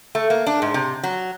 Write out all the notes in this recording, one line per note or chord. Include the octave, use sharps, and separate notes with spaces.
A3
A#3
D4
G#2
C3
F#3